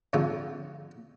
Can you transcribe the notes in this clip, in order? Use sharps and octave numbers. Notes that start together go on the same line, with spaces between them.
F2 G#2 D3 F4 A4